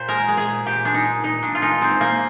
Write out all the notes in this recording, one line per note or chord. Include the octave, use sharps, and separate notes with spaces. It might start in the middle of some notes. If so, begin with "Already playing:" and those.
Already playing: A#2 C5
G#3 A#4
G#3
G#4
A#2
A#2 G4
G#3 D4
D#4
G#3
A#2 D#4
A#2 D4
F4
G#3 D#4
G#3 C4
A#2 A#3